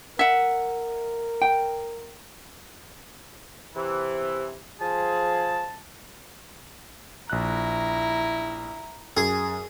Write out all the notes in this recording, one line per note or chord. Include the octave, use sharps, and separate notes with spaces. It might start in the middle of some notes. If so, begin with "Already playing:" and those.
A#4 E5 F#5
G5
C3 E3
F3 G#4 A5
A#1 E4 A#5 F#6
F#2 G#4